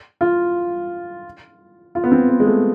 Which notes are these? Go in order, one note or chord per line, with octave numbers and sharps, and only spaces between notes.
F4
F4
B3
C4
B3
G#3
A3